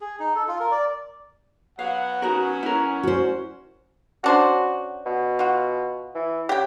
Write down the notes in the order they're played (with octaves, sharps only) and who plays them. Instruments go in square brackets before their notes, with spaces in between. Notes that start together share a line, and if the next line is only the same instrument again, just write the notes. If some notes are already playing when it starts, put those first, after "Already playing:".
[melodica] G#4
D#4
A4
F4
A#4
D5
[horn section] F#3 B3 [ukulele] F5 [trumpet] F#5
[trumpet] C#4 [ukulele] D#4 F#4 A#4
[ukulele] E4 A#4
[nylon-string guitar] F#4 C5
[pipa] C#4 D4 C5 [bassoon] F#4
[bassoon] B2
[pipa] F4 F#4
[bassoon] E3
[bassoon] C#3 [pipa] G4 G5